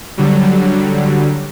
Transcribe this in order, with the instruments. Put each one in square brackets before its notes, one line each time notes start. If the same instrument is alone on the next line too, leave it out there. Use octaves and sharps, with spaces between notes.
[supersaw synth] D3 F#3 G3